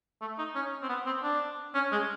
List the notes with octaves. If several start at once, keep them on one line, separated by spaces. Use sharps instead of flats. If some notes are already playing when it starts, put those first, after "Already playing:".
A3
D#4
C#4
C4
B3
C4
D4
C#4
G#3